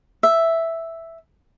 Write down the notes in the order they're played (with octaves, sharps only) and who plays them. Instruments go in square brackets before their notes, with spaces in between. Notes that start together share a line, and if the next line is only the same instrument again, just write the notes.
[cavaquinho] E5